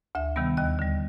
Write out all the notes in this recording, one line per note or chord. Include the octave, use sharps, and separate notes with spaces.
D2 E5
C3 D#3 G3 B3
D#2 D#5
D3 G3